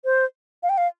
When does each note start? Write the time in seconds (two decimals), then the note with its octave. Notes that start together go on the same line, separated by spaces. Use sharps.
0.05 C5
0.63 F5
0.69 G5
0.78 F5